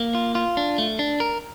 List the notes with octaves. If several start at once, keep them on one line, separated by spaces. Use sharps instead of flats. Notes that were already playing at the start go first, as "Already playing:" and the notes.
Already playing: A#3
F4
F4
D4
A3
D4
A#4